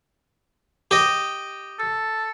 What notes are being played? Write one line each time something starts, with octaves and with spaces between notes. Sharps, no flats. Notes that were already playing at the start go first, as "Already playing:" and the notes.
G4 D#5
A4